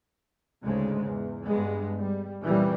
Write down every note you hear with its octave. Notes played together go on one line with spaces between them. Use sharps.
D2 G#2 C#3 G#3
E2
G2 G#3 B3
G3
F1 A#2 E3 G3 C#4